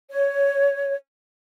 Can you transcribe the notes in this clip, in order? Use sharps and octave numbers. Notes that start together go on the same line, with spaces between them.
C#5